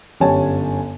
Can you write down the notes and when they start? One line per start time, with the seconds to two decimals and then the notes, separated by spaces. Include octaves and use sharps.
0.20 G1 F#2 G4 C#5 G#5 A5